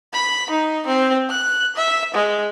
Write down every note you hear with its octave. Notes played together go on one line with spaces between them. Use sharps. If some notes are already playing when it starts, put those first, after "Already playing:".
B5
D#4
C4
F#6
E5
G#3